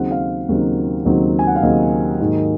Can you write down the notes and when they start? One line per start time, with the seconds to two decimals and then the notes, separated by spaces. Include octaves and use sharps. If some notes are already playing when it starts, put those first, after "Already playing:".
Already playing: D#2 C#3 F#3 C4 D#4 F#5
0.11 F5
0.49 D#2 C#3 F#3 C4 D#4
1.05 D#2 C#3 F#3 C4 D#4
1.39 G#5
1.47 F#5
1.55 F5
1.62 D#2 C#3 F#3 C4 D#4 D#5
2.20 G#2 D#3 F#3 A#3 D#4